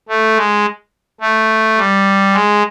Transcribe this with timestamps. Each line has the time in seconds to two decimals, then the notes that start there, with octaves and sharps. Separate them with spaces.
0.09 A3
0.36 G#3
1.21 A3
1.77 G3
2.33 G#3